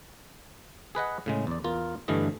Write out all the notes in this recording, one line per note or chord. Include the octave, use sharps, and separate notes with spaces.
G#4 B4 D#5 F#5
A2 C#3 G#3
E2 D5
E2 F4 A#4
G2 D3 E3 A3 D#5